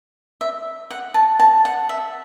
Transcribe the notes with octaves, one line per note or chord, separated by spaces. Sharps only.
E5
F#5
A5
A5
F#5
E5